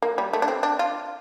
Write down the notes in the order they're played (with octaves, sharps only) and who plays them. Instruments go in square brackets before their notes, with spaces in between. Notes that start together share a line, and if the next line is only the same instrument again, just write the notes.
[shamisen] A#3
G3
A3
D4
C4
D4
F4